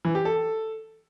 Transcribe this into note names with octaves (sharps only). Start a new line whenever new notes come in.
E3
G4
A4